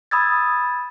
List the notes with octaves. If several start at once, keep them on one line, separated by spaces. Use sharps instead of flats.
B5 D#6 E6 G#6 A6